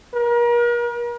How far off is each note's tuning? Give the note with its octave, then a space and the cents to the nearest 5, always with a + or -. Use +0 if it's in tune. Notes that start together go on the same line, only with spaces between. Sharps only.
A#4 +40